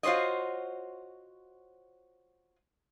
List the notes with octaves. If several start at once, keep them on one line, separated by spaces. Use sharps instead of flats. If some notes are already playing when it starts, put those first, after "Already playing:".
F4 F#4 C5 C#5 D#5